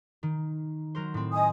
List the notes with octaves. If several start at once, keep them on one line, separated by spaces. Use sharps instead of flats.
D#3
F#3 A#4 C5
A2 C4
D#5 G#5 D#6